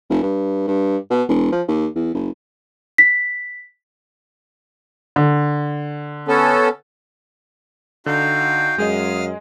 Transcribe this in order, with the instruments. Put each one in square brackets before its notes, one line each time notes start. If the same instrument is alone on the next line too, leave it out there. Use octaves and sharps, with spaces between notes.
[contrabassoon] F1
G2
G2
B2
E1
F3
D#2
E2
F#1
[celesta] B6
[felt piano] D3
[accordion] B3 C#4 A4
[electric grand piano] D3 [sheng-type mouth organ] D#4 F#4 F5 [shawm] G5
[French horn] F#2 [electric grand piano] G#3 G#4 D#5 [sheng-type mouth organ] F5 D#6 F6